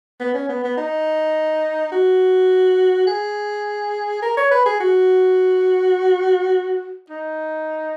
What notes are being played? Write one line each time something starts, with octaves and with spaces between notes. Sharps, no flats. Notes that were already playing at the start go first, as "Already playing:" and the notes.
B3
C#4
B3
B3
D#4
F#4
G#4
A#4
C#5
B4
G#4
F#4
D#4